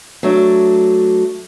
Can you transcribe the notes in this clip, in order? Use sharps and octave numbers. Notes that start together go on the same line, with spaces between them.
F#3 A3 D4